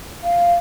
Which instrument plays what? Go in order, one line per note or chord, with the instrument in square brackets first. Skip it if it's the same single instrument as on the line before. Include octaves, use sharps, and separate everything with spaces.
[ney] F5